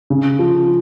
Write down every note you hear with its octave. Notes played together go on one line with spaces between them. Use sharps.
C#3
F3